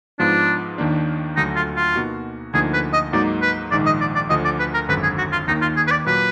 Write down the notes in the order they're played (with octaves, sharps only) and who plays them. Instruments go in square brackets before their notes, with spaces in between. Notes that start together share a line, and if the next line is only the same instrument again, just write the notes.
[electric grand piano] G#2 F3 B3 F4 [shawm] D4
[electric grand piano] D#2 D#3 A#3 D4
[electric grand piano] D2 D3 F#3 [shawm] D#4
[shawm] F4
F4
[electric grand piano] B2 A#3 D#4 F#4
[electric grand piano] D2 D3 F3 A#3 D#4 [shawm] G#4
[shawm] B4
D#5
[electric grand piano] G#2 F#3 A#3 D#4 F#4 [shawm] D5
[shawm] B4
[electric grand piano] A#1 G#2 D#3 [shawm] D5
[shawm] D#5
D5
D5
[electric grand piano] D2 D3 F3 [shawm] D#5
[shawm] D5
B4
A#4
[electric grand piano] G#1 F#2 D3 [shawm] B4
[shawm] G#4
F#4
F4
[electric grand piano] D#2 D#3 A#3 [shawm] D#4
[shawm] F4
G#4
B4
D5
[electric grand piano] A#2 F#3 [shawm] B4